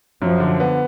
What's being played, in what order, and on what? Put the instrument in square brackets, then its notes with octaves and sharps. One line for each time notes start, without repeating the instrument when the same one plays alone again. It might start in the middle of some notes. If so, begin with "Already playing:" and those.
[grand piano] F#2 [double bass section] F3
[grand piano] D3
B3